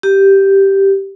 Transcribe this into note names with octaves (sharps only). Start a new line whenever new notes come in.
G4